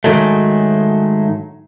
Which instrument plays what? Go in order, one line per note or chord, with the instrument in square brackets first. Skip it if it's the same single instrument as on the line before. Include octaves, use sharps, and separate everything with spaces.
[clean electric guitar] G#2 D#3 F#3 G#3 A3